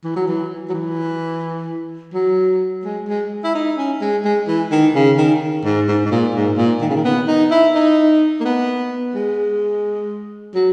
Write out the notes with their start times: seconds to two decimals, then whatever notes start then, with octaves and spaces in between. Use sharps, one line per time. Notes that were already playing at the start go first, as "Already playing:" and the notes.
0.04 E3
0.16 F#3
0.28 E3
0.69 F#3
0.74 E3
2.14 F#3
2.85 G#3
3.08 G#3
3.44 E4
3.55 D#4
3.77 C#4
4.01 G#3
4.25 G#3
4.48 E3
4.71 D#3
4.95 C#3
5.18 D#3
5.65 G#2
5.88 G#2
6.05 G#2
6.11 A#2
6.35 G#2
6.57 A#2
6.81 D#3
6.90 C#3
6.97 D#3
7.05 B3
7.28 D#4
7.51 E4
7.75 D#4
8.40 A#3
8.45 B3
9.15 G#3
10.55 F#3